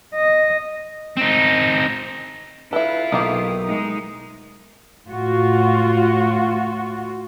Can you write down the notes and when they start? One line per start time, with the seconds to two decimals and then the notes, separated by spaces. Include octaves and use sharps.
0.15 D#5
1.17 C4 D#4
2.73 E4 F4 A4 B4 E5
3.12 B1 D#3 A#3 G4 D#6
3.65 G#3 D#4
5.08 A2 F4 F#4